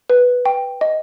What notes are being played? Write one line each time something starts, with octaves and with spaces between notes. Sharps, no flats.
B4
G5
D#5